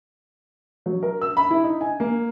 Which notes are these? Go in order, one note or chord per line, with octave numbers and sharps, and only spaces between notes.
F#3
A#4
E6
B5
E4
D#4
G#5
A#3